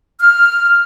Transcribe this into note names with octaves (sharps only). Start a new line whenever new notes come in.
F6